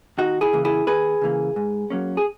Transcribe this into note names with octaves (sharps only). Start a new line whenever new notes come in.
D#2 D#4 F#4
E4 G#4
C#3 E3 A#3
E4 G#4
D#2 G#4 B4
C#3 E3 A#3
G#2
F#3 A#3 C#4
G#4